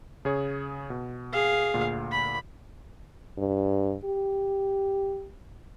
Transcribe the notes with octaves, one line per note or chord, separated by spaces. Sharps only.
C#3 G#4 C#5
B2
G#4 F5
D2 A#2
B5
G2
G4